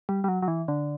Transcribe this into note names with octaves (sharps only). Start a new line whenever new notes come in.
G3
G3
F#3
F#3
E3
D3